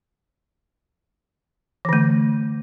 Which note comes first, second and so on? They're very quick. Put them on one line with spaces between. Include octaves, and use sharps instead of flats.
E3 D3 A3